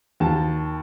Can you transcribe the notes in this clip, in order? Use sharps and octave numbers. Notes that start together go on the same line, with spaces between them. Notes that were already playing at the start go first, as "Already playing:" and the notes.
D#2 A5